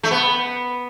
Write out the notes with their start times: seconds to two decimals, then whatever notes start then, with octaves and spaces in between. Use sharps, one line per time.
0.03 A3
0.11 B3